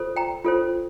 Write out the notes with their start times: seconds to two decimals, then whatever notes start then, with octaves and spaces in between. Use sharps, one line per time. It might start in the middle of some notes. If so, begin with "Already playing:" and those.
Already playing: F4 A4 C5
0.16 G5 A#5
0.45 F4 A4 C5